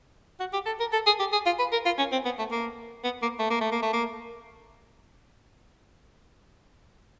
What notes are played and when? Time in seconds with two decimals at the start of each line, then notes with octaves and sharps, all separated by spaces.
0.40 F#4
0.53 G4
0.66 A4
0.80 A#4
0.93 A4
1.06 G#4
1.19 G4
1.33 G#4
1.46 F4
1.59 B4
1.72 A#4
1.85 F4
1.98 C#4
2.12 C4
2.25 B3
2.39 A3
2.51 A#3
3.04 B3
3.22 A#3
3.39 A3
3.50 A#3
3.61 A3
3.72 A#3
3.82 A3
3.93 A#3